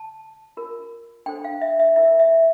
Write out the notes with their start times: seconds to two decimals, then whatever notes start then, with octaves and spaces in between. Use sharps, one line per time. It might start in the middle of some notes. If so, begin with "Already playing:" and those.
Already playing: A5
0.57 F4 A#4
1.26 D4 A4 C5 G5
1.44 F5
1.61 E5
1.80 E5
1.96 E4 A#4 E5
2.20 E5